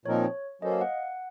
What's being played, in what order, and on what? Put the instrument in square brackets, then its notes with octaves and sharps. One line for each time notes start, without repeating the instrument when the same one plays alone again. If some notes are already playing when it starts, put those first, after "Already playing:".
[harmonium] A#2 F3 C4 D#4 A#4 [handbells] C#5
[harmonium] F#3 A#3 C#4 A4 C5 [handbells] D#5
[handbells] F5
F#5